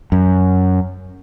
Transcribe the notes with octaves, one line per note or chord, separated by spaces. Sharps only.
F#2